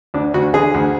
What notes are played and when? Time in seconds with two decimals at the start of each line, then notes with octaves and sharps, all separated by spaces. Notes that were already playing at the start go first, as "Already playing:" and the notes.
0.14 D2 D4
0.34 D2 F#4
0.54 D3 G#4
0.74 D2